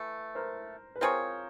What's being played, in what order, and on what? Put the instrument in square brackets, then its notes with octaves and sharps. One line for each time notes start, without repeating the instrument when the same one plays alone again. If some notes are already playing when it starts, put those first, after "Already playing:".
Already playing: [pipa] E3 A3
[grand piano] A#4 C5
B4
[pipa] C4 F4 G#4 C#5 [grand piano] A#4 C5